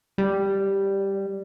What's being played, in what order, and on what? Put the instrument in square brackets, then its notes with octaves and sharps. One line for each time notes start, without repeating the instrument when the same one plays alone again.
[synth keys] G3